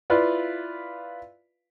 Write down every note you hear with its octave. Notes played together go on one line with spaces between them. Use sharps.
E4 F4 B4 D5 F5